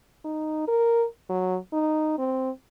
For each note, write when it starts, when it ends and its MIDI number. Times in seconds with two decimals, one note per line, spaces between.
0.25 0.67 63
0.68 1.05 70
1.29 1.57 54
1.73 2.17 63
2.18 2.50 60